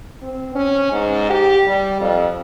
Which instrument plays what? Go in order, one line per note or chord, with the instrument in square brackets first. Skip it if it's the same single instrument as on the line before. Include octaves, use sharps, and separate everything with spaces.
[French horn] C4
C#4
G#2
G4
G3
F2